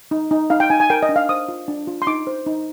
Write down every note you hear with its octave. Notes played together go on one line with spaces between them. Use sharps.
D#4
D#4
D#4 F5
G5
D#4 G#5
G#5
A#4 G5
D#5
D4
F5
C5 D#6
F4
D4
F4
C6
D#4 D6
C5
D#4